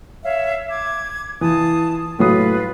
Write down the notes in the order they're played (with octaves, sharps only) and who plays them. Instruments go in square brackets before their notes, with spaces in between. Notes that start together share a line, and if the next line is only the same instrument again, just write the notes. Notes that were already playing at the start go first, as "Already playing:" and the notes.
[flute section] C#5 E5 F5
D6 G#6
[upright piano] E3 [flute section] F4 A5 D#6
[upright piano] A2 F#3 D#6 [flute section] F4 B4